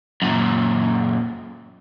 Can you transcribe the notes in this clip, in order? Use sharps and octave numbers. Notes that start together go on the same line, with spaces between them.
F#2 A#2